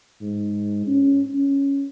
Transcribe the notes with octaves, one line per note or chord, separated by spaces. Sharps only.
G#2
C#4
C#4